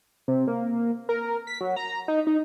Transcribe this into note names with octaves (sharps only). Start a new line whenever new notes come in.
C3
A#3
A#4
B6
F#3
A#5
D#4
D#4